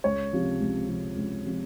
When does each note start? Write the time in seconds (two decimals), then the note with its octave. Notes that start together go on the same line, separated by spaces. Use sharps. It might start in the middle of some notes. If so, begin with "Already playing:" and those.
0.04 C#2 C#5
0.33 C3 F3
0.61 C#2
0.89 C3 F3
1.17 C#2
1.46 C3 F3